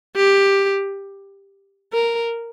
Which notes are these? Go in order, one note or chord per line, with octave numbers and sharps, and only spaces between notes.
G4
A#4